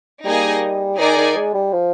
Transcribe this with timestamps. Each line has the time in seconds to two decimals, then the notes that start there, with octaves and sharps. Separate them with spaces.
0.24 G3 A#3 D#4 G#4 D#5 G#5
0.98 D#3 D#4 G#4 D5 G#5
1.17 D#3
1.36 G#3
1.54 G3
1.73 F3